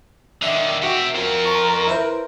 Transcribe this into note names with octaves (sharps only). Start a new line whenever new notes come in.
D3 D#3 E5 D6
F#4 E5 G5 C#7
C4 F4 A#4
A#5 C#6
E4 B4 C5